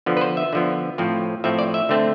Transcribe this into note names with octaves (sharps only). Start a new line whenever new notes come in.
D3 F3 B3
B4
C5
E5
D3 F3 B3
A2 F3 C4
A2 F3 C4 E5
D5
E5
D3 A3 C4